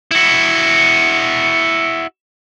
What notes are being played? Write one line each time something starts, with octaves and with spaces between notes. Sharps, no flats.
E4 F#4